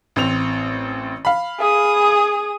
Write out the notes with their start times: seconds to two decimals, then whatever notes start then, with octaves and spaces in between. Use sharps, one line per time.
0.16 A1 C4 F7
1.25 F5 B5
1.59 G#4 D#6